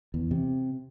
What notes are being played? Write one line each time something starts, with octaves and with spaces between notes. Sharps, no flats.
E2
C3